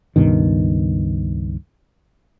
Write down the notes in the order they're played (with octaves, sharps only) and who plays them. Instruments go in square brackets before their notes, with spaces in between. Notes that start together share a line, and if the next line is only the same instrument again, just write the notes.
[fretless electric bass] C#2 G2 B2 D#3